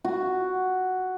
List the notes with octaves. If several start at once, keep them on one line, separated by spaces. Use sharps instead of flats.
F#4